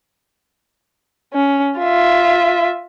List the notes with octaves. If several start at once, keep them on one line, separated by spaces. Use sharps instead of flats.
C#4
F4 E5